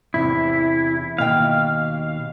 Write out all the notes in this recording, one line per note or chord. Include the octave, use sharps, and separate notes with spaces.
E2 C3 E4
D#2 B2 F5 G5